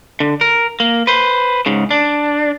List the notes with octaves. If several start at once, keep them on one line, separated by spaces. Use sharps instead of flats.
D3
A#4
A#3
B4 C5
G#2 C#3
D4